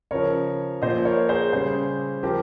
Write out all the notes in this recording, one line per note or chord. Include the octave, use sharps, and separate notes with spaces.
C#3 F3 A#4 C#5
A#2 F3 C5 D#5
A#4 C#5
G#4 C5
C#3 G3 G#4 C5
F3 G4 A#4